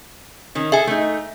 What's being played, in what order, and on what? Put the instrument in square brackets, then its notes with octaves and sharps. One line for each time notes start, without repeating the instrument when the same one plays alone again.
[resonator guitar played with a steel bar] D#3 C#4
[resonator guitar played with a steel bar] G#4 A4 [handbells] E5 G#5
[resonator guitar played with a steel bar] A3 D#4